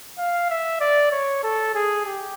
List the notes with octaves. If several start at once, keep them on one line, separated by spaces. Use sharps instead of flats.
F5
E5
D5
C#5
A4
G#4
G4